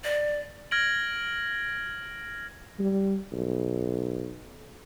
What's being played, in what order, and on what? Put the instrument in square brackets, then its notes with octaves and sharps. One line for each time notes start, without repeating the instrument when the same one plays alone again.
[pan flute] D5
[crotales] F6 G#6 A#6 D7 F#7
[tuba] G3
B1